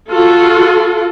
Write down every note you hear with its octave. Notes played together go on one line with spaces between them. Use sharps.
F4 F#4 A4